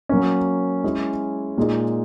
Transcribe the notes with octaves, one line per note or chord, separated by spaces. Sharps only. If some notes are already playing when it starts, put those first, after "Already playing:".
F#3 A#3 C#4
G#3 C#4 E4 G#4
A#2 G#3 D#4 G#4